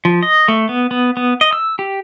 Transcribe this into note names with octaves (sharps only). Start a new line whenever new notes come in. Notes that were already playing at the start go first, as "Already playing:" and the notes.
F3
D#5
A3
B3
B3
B3
D#5
E6
G4